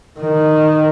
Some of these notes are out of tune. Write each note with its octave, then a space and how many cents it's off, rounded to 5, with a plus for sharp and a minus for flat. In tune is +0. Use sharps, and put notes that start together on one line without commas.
D#3 -10